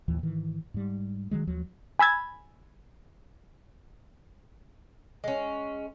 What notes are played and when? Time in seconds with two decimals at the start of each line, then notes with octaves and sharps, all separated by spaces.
0.08 A1 D#2 E3 F3
0.23 G#2 D#3 E3
0.74 G#2 G3
1.31 D#3 F#3 G#3
1.47 D#2 F3 F#3
1.99 G#5 B5 E6 G#6 A6
5.24 G#3 C#4